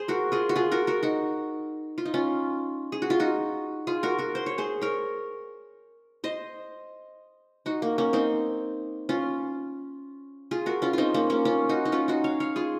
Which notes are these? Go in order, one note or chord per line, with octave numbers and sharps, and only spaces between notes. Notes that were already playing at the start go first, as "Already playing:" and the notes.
Already playing: G#4 C5
F#4 A#4
F4 G#4
F#4
F4 G#4
F#4 A#4
F#4 A#4
D#4 F#4
F4
D#4
C#4 F4
G#4
F#4
F4
D#4 F#4
F4 G#4
F#4 A#4
F#4 A#4
C5
C#5
G#4 C5
A#4 C#5
C5 D#5
D#4 F#4
A#3
A#3 C#4
C4 D#4
C#4 F4
F4 G#4
F#4 A#4
C#4 F4
C4 D#4 F4
A#3 C#4
A#3 C#4
C#4 F4
D#4 F#4
D#4
C#4 F4
D#4 F#4
C#5 F5
C#5 F5
F4 G#4